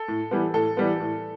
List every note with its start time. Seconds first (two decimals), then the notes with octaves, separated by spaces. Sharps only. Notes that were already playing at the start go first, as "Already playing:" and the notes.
Already playing: A4
0.08 A2
0.31 E3 G3 B3
0.54 A2 A4
0.77 E3 G3 B3
1.00 A2